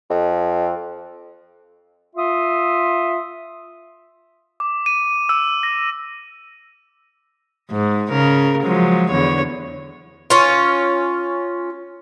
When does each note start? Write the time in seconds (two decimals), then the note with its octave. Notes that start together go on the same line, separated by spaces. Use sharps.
0.10 F2
2.16 F4 E5 C6 D#6
4.60 D6
4.86 D#7
5.29 E6
5.63 A#6
7.71 G#2
8.10 C#3 A#4
8.63 F3 F#3 G#3
9.11 E2 D3 C#5
10.30 C#4 F4